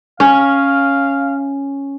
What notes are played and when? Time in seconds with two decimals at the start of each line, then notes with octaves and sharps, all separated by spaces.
0.20 C#4 F5